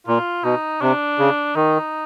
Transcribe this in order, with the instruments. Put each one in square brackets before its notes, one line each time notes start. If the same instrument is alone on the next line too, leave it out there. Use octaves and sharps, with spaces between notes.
[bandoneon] A#2 [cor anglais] F4
[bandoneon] B2 [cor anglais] D#4
[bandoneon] C3 [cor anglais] D4
[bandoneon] C#3
[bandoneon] D#3 [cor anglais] D#4